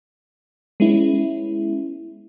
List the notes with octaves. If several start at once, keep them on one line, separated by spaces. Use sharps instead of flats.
G#3 B3 C#4 E4